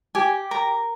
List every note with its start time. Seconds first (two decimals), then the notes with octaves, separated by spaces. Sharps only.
0.15 G4 G#5
0.51 A#4 A#5